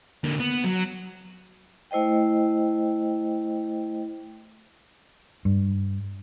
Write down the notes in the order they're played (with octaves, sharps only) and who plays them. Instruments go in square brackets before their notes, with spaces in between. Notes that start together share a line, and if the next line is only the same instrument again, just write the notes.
[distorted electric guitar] D3 A#3
B3
F#3
[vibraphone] A3 E4 C5 D#5 G5
[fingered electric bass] G2